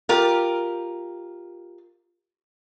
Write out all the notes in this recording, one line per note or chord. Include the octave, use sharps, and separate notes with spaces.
F4 G4 A#4